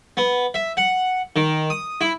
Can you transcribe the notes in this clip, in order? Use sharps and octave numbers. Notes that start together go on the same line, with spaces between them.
B3
E5
F#5
D#3
D#6
E4